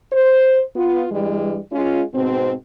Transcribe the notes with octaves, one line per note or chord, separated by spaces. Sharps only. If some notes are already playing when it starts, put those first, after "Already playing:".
C5
B3 F4
G2 E3 G3 G#3
G#3 C#4 F4
G#2 B2 C4